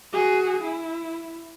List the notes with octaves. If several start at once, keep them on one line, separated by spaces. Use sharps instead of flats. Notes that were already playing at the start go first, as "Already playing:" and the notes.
F#4 G#4
E4